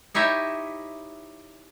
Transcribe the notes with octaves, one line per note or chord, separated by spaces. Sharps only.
D#4 E4 G4 C#5 D#5 E5